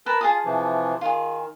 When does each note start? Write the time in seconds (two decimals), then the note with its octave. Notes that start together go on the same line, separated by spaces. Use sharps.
0.06 A#4 B4 A5
0.21 F4 G#4 A5 D#6
0.45 C3 E3 F3
1.01 D#3 F4 G#4